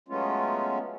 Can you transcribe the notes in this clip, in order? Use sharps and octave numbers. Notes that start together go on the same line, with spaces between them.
F#3 G#3 A3 B3 C#4 F4